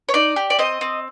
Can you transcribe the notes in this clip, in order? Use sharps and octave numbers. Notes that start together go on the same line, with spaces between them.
C#5
D#4 D5
G4
D5
C4 D#5
C4